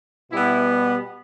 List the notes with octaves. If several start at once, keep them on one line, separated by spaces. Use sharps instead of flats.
B2 G3 B3 E4